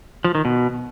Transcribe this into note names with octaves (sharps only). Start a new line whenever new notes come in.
F3
D#3
B2